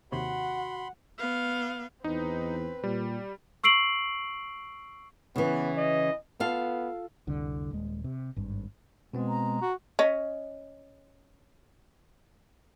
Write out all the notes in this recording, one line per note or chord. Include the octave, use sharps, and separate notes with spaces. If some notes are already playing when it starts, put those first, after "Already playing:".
D#2 C3 F#4 C#5 F#5 B5 C6
B3 F5
E2 C4 D#4 B4
A#2 G3
C#6 E6 C7 D7 F#7
C#3 E3 B3
D#5
B3 F4 A4 F5
F1 C2 D3
D#1 G#3
C3
G#1 G2
B2 G#3 B3 C4
A#5
F#4
C#4 C#5 D#5